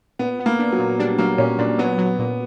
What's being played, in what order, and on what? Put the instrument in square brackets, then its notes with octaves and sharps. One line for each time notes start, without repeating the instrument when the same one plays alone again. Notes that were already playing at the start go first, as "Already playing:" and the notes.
[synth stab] A#2 [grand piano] B3
[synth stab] B3
[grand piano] A#3
[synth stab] D4
[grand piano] F#3
[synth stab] A#2
[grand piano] G3 [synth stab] D4
[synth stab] F#3 [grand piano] A#3
[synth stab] A#2 [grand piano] C#4
[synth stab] A#2 [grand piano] D4
[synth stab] F#3 [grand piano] B3
[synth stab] F#3
A#2